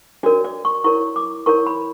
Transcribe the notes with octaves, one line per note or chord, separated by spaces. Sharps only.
D4 F#4 A#4 C#5 D5
D5
C#6
E4 A#4 C#5 C#6
D6
E4 A#4 C#5 C#6
B5